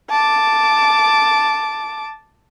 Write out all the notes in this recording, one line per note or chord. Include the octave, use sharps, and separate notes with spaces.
A5 D6